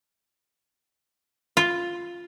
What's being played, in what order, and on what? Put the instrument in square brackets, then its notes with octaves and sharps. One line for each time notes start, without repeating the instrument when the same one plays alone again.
[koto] F4